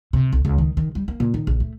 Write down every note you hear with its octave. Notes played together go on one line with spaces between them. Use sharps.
C3
B1
C#2
D#3
D#3
G3
A#3
A#2
D#3
A#1
A3